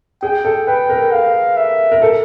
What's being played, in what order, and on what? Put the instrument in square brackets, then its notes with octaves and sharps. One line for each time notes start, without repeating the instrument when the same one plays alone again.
[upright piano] G#4 [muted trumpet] G5
[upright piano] A4
[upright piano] B4 [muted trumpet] G5
[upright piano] A#4
[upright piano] A4 [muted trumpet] F5
[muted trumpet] E5
[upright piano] A#4
A4